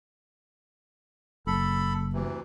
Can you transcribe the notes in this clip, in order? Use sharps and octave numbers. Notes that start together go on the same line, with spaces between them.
F#1 A4 B5
D2 C3 E3